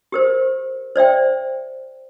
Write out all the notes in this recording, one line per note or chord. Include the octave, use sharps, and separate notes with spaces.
G4 A#4 C5
C5 D5 E5 G5